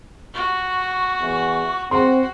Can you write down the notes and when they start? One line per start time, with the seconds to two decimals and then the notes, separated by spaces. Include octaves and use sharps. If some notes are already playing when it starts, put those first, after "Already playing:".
0.34 F#4 C#6
1.21 E2
1.91 C4 F#4 F#5 C6